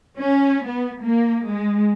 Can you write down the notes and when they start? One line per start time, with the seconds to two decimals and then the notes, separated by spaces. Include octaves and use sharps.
0.19 C#4
0.67 B3
1.04 A#3
1.48 G#3